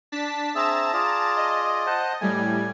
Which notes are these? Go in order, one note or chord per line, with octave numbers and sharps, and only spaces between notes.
D4 A5 B6
C4 G#4 E5 A5 A#5 E7
F4 G#4 D5
D#5
C5 F#5 A5
A2 G3 G#5